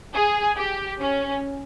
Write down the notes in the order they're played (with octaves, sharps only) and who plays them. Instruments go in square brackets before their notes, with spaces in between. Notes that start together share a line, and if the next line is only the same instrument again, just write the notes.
[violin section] G#4
G4
C#4